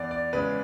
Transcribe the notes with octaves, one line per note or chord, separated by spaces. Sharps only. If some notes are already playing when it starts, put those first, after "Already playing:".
Already playing: E2 D5
D5
C#3 G#3 B4